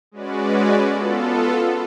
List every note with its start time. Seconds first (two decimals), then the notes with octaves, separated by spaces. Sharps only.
0.11 G#3 C#4 F#4 B4 D5
0.90 B3 F4 A4